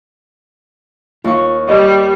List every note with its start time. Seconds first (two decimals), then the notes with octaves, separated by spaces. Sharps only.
1.24 D#2 F4 F5 C#6
1.69 G3 D#5